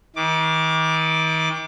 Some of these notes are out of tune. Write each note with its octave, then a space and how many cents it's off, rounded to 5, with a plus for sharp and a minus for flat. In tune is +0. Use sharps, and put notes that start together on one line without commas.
D#3 +40 D6 +0